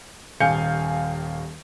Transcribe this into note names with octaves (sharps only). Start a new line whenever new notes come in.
D#1 D#2 F5 G#5 G6 C#7